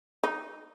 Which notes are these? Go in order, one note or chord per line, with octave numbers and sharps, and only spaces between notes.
D#4